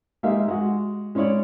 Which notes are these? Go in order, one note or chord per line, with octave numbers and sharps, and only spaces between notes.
G#3 A#3 D#4 G4 E5 F5
G#3 F#4
G#3 C#4 E4 C#5 D5